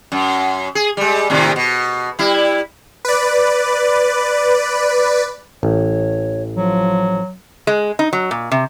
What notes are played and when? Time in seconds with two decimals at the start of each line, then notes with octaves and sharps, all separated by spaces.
0.12 F#2
0.75 G#4
0.97 G3 G#3
1.30 A2 C3 D#3
1.56 B2
2.19 G3 E4
3.05 B4 D5
5.63 A1 C#5
6.56 F3 F#3
7.67 G#3
7.99 D#4
8.13 F#3
8.31 A#2
8.51 C3